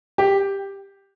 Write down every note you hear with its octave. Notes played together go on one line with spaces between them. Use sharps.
G4